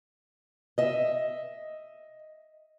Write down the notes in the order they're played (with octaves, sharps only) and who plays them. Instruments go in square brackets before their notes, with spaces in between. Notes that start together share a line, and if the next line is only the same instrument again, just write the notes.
[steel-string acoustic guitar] D#5 E5